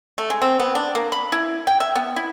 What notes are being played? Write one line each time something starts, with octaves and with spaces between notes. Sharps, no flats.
A3
G#3
C4
B3
D4
A#3
B5
E4
G5
E5
B3
E4